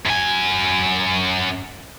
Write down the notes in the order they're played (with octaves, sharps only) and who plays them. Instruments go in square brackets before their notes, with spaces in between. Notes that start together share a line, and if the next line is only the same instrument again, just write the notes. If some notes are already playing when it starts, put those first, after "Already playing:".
[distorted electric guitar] F#2 G#5